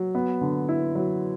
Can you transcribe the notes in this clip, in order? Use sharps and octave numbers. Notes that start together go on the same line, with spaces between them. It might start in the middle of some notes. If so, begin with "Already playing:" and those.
Already playing: F#3
B3
D3
E4
F#3